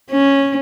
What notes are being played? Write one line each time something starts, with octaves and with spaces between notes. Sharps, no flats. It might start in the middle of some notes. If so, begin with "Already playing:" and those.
C#4